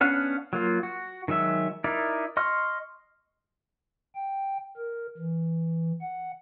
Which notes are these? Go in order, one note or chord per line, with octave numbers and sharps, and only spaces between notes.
B3 C#4 D4 F5 F#5
F#3 A#3 F4
F#4
D#3 F#3 G#3 E5
D#4 E4 A#4 D5
D#5 C6 C#6 F6
G5
A#4
E3
F#5